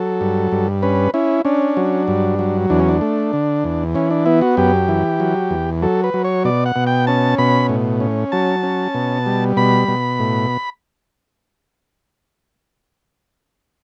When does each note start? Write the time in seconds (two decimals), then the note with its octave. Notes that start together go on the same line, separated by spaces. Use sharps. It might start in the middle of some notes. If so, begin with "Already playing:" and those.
Already playing: F#3 A4
0.21 G2
0.52 G2
0.82 C#4 B4
1.14 C#4 E4
1.45 C#4 D4
1.77 F#3
2.08 G2
2.39 F#3
2.70 E2 D4
2.79 C#4
2.89 D4
3.01 A3
3.33 D3
3.64 E2
3.95 E3 C#4
4.11 D4
4.26 B3 E4
4.41 F#4
4.57 F#2 G4
4.88 E3
5.20 F#3
5.51 E2
5.82 F#3 A4
6.04 B4
6.14 F#3
6.24 C#5
6.44 B2 D5
6.66 F#5
6.76 B2
6.87 G5
7.07 C#4 A5
7.38 B2 B5
7.69 A2
8.00 C#4
8.32 F#3 A5
8.63 C#4
8.94 B2
9.26 G3
9.57 B2 B5
9.88 B2
10.20 A2